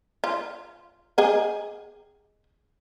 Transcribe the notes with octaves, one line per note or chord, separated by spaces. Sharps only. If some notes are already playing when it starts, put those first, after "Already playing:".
F4
G4 G#4 D#5